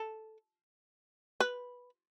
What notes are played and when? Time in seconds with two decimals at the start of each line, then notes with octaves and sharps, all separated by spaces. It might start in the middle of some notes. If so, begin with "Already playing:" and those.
Already playing: A4
1.40 B4